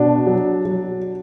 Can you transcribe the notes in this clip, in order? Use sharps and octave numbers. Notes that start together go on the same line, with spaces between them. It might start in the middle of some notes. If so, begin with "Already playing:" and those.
Already playing: B2 D4
F#3
F#3